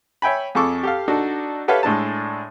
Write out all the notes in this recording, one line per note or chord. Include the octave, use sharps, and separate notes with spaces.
C#5 E5 G5 G#5 B5
F2 G#4 A4 C#6 D6 E6
G4 A4 F5
D4 D#4 F#4 A4
G4 A4 B4 C#5 E5 F5
A2 G#3 D4 A4 A5